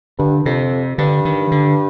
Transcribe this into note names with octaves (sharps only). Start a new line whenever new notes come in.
G2 D3
F2 C3
G2 D3
D#3
D3